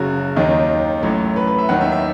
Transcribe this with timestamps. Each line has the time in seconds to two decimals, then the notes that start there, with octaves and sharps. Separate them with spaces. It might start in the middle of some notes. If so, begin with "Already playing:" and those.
Already playing: F#1 F#2 C#3 F#3 F#4
0.36 D#2 D#3 F#3 D#4
1.02 A1 A2 F#3
1.36 B4
1.47 B4
1.58 E5
1.69 D#2 D#3 F#3 F#5
1.81 E5
1.92 E5